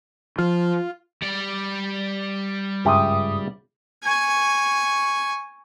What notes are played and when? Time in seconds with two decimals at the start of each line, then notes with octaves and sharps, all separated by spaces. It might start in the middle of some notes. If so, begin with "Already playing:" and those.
0.38 F3 F4
1.22 G3 D5
2.85 C#2 G2 G4 E5 D#6
4.04 G#5 C#6